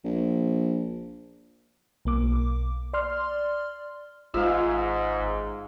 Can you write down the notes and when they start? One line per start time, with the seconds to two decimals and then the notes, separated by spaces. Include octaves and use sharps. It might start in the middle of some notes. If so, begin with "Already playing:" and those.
0.04 A#1
2.05 B1 A#3 D6
2.94 D5 C6 F6
4.34 G#1 G#2 F4 E5 F5